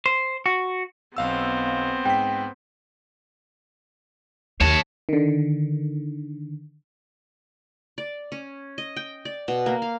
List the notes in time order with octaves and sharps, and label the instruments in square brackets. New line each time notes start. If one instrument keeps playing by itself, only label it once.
[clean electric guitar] C5
F#4
[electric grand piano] B1 F5 E6 [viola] B3 C4
[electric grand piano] G#2 B6 [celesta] G5
[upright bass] D#2 [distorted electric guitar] C#5 A5
[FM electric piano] D3 D#3
[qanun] D5
C#4
D#5
G5
D5
B2
A#3
F5